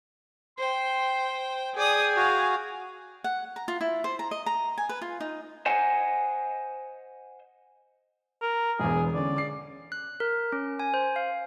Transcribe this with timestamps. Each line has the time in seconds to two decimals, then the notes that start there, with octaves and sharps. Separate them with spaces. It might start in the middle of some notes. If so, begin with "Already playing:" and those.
0.58 C5 G5 C6
1.77 G#4 D5 G5 D#6
2.16 F#4 F5
3.24 F#5
3.56 A#5
3.68 F4
3.81 E4
4.04 C5
4.19 A#5
4.31 D#5
4.46 A#5
4.78 G#5
4.89 B4
5.02 F4
5.20 D#4
5.66 C5 D#5 F#5 G#5
8.42 A#4
8.79 E1 E2 G#4
9.14 D3 C#4 D5
9.36 D6 C7
9.92 F#6
10.20 A#4
10.52 C#4
10.80 G#5
10.94 C5
11.16 F5